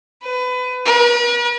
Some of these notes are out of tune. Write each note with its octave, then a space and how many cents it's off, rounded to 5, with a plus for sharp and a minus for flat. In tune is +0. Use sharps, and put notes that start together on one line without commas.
B4 +25
B4 -45